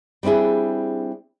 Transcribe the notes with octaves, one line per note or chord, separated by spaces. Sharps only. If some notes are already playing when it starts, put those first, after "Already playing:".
G3 C4 D4 E4 G#4